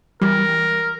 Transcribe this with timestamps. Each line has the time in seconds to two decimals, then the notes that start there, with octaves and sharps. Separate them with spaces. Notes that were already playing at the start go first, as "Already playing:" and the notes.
0.21 E3 G3 A#4